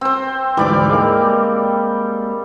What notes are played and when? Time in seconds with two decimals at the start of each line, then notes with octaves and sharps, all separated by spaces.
0.01 C4 C5
0.57 D2 G#2 E3 G3 D5 D6
0.89 G#3 A#3